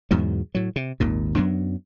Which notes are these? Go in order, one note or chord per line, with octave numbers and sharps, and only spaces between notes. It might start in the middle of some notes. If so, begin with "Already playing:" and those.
E2 G#2 B2 F#3
A2 F#3
C3
G#1 D#2 A#2
F#2 F#3 B3 D4